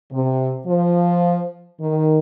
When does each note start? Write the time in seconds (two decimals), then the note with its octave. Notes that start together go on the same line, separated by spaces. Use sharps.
0.12 C3
0.67 F3
1.81 D#3